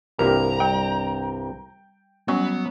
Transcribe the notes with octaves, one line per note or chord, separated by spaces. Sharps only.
C2 G2 A#3 F4 G4 A#4 A#5
G3 G5
F#3 G3 B3 C#4 C#6